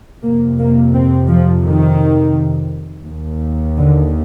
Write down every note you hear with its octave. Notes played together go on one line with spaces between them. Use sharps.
F2 C3 A#3
A#3
C4
F3
D#3
D#2
D3